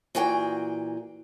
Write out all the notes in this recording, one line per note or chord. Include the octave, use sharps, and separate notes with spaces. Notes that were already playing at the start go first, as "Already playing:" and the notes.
A#2 E3 F#4 G#4 G5